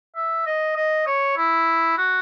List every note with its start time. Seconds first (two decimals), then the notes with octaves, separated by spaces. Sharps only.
0.16 E5
0.46 D#5
0.76 D#5
1.06 C#5
1.37 E4
1.98 F#4